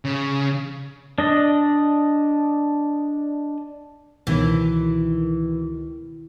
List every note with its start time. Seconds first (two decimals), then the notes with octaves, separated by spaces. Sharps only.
0.05 C#3
1.18 D4 D#5
4.27 C#2 B2 D#3 E3